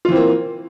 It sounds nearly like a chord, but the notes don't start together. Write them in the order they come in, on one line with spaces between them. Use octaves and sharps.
F4 E3 C4 A#3